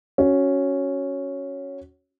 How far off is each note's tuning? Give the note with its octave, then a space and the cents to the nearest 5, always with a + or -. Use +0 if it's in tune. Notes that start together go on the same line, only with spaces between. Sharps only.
C#4 +0 F#4 +0